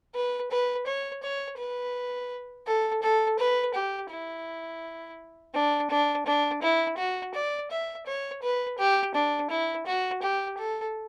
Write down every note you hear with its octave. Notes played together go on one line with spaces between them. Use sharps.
B4
B4
C#5
C#5
B4
A4
A4
B4
G4
E4
D4
D4
D4
E4
F#4
D5
E5
C#5
B4
G4
D4
E4
F#4
G4
A4